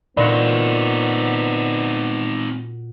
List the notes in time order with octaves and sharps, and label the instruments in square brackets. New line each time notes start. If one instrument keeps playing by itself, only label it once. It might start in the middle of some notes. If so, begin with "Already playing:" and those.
[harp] A#2 F#4 [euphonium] B3 [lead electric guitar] C4 D#4 [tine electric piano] D5 B5